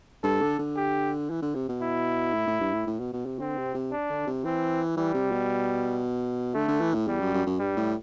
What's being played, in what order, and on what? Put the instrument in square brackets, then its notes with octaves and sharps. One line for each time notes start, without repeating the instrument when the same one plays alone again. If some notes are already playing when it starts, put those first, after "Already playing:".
[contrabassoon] G2 [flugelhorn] A4
[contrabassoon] D3
D3
[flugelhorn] G4
[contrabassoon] E3
D3
C3
B2
[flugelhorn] E4
[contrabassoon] A2
A2
G2
A2
A2
B2
B2
C3
[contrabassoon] D3 [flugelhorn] C4
[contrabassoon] C3
C3
[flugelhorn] D4
[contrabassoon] D3
C3
[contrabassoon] E3 [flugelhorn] C4
[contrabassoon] E3 [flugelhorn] G3
[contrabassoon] C3
B2
[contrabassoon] D3 [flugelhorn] A3
[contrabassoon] D3
E3
A2
[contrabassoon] E2 [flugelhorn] G3
[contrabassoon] F#2
F#2
F#2
[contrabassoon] G2 [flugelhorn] G3
[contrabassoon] A2